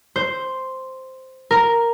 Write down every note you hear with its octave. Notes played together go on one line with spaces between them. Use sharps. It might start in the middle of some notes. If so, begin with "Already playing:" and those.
C5
A#4